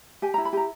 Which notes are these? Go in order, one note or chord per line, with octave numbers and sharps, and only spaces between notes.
G4 G#5
A#5
E4
B5
G4 A#5